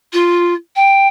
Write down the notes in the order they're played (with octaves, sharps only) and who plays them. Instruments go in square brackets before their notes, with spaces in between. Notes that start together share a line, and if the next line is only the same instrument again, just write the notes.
[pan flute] F4
G5